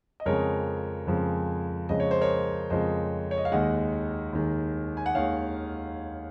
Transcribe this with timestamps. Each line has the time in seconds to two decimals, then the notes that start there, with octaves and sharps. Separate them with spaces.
0.20 D#5
0.26 F2 C#3 F3 G#3 A#4 C#5
1.07 F2 C#3 F3 G#3
1.89 F2 C#3 F3 G#3 D#5
2.00 C#5
2.11 C5
2.21 A#4 C#5
2.70 F2 C#3 F3 G#3 C5 D#5
3.31 C#5
3.38 D#5
3.45 F5
3.52 D#2 D#3 G#3 D#5 F#5
4.33 D#2 D#3 G#3
4.97 G#5
5.06 F#5
5.15 D#2 D#3 G#3 C#5 F5